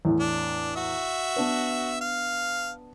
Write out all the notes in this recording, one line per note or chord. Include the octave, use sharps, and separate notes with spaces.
E2 A2
D4
F#4 E5
B3 D4 B4
F5